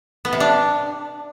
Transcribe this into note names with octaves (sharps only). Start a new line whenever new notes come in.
B3
C3
D4